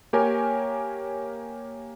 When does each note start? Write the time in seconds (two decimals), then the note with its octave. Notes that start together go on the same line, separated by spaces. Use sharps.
0.13 A#3 G4 A#4 C#5 G#5